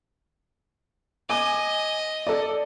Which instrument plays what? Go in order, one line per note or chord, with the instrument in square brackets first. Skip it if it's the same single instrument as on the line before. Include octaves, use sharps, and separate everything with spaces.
[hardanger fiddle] D#5 [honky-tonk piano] G#5 D6
[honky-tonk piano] A4 D5